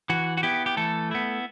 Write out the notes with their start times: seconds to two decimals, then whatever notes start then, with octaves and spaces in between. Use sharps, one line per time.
0.10 E3 F#4
0.37 F#4
0.43 B3 E4 G4
0.66 G4
0.77 E3 A3 A4
1.11 B3 E4